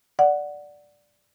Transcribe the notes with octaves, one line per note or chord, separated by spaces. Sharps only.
D5 F#5